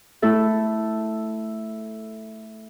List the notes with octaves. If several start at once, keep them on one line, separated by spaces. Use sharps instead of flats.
A3 E4 A4